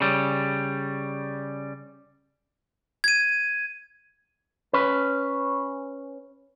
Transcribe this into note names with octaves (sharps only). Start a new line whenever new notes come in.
C#3 G3
G#6 D#7
C#4 B4